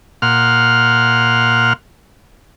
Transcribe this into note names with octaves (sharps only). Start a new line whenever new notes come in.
A#2 F5 F#5 C6 F6